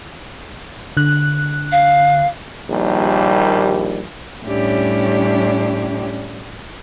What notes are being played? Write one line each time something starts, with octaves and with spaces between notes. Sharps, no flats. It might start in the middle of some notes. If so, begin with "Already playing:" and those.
D3 F#6
F5
A#1 D#2 G3
A2 G3 C#4 D4 E4 G4